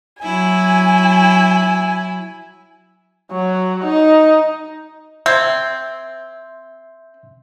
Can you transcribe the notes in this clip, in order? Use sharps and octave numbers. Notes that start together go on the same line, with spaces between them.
F#3 E4 G#5
F#3
D#4
C4 E5 G#6